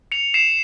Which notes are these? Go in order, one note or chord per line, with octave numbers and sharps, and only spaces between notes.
C#7 F7
C7 E7